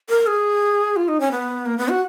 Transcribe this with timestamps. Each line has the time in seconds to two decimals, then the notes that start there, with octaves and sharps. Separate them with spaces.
0.09 A#4
0.27 G#4
0.96 F4
1.08 D#4
1.20 C#4
1.31 B3
1.66 A#3
1.78 B3
1.89 F#4